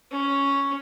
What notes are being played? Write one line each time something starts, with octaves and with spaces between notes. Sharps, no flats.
C#4